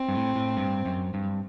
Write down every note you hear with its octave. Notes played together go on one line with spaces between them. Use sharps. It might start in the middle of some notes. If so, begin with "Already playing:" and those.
Already playing: C4
G2
A2
A2
G2
F#2
G2